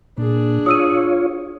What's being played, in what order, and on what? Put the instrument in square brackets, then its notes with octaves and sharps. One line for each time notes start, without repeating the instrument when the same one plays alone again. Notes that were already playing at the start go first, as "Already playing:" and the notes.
[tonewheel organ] A#2 [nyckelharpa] D4 G#4
[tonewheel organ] F4 C#5 [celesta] D#6 E6 D#7